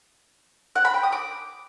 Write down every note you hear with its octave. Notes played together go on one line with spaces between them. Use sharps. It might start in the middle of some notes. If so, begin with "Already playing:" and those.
F#5
B5
G5
D#6
D6